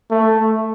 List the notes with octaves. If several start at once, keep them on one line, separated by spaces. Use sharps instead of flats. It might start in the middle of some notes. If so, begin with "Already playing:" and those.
A3